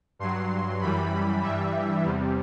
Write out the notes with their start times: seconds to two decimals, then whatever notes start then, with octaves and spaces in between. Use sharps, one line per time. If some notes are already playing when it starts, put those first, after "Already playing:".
0.19 G2 F#3 C6
0.81 F#2 E3 G3 B5
1.42 G2 E3 G3 E5
2.04 E2 C3 G3